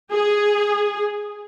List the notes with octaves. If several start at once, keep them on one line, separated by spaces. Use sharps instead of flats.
G#4